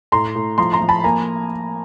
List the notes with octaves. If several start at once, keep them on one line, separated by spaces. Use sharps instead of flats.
A2 A#5 C6
A2
F3 A#5 C6
A#5 C6
F3
A5 B5
A#3 G#5 A#5